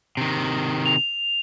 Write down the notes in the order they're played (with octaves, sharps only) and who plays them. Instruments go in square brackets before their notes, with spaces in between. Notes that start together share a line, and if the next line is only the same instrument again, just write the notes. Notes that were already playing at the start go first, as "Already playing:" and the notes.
[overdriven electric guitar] C3 D#3
[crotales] F7